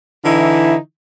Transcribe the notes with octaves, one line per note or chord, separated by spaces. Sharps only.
D3 E3 D#4 E4